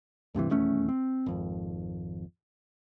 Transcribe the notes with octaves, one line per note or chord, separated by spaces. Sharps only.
D2 G2 C3 E3
D#1 E2 A3 C#4
C4
G#1 F2